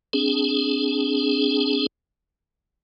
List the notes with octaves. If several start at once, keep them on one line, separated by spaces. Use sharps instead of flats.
C4 D4 G#4